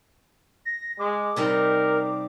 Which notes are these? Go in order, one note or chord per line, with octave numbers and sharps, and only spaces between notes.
A#6
G#3 D6
C3 G3 D#4 A#4